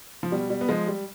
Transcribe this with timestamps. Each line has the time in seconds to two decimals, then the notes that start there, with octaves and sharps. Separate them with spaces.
0.23 F3
0.32 B2 G3
0.50 G3
0.61 B3
0.69 F3 G#3
0.87 G3